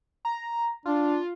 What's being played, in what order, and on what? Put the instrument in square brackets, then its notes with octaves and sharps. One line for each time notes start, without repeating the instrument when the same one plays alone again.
[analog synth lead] A#5
[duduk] D4 [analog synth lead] F4